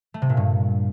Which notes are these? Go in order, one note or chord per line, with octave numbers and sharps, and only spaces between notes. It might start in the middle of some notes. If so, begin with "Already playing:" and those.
A3
C3
A#2
G2